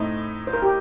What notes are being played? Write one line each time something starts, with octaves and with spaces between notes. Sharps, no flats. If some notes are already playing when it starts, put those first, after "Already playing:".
Already playing: A2 A3 C4 D#4
C5
A#4
G4